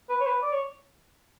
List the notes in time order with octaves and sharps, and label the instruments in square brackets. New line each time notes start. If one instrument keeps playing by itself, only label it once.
[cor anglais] B4
C#5
B4
D5
C#5